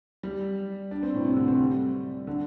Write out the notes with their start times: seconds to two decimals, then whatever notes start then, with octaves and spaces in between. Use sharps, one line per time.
0.23 G3
0.91 D4
1.03 C4
1.15 A2
1.25 C3
1.37 D3
1.48 C4
1.59 G3
2.27 D3